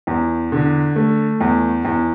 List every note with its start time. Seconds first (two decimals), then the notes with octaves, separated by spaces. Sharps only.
0.07 E2
0.52 D3
0.96 A3
1.41 E2
1.85 E2